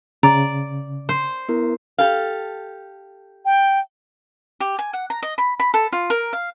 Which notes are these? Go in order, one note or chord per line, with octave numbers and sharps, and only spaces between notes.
C#3 D5 A#5
C5
B3 E4 A#4
G4 A4 F5
G5
G4
G#5
F#5
A#5
D#5
B5
B5
A4
F4
A#4
F5